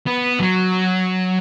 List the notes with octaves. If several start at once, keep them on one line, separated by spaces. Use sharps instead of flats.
B3
F#3